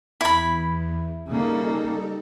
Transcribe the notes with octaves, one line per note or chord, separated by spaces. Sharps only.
E2 E4 B5
C#3 G3 A#3 D#4 A4